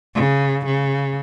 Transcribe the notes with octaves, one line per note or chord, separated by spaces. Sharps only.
C#3
C#3